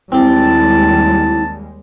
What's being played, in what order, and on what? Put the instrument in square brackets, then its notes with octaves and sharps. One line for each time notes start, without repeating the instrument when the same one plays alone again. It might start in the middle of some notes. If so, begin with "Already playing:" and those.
[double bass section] D#2 G3 G#3 [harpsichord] C4 G4 [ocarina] E4 [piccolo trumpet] A5